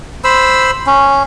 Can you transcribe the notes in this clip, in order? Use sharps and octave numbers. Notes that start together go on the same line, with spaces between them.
C5 B5 E6
C#4